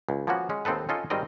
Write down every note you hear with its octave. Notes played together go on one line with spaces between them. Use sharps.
C#2
F3 A#3 B3 C#4 F#4
G#3 C#4
D#2 C4 D#4 A4 B4
C#4 D#4 F4 A4 D#5 G#5
G#1 D#3 G3 C4 A#4 D#5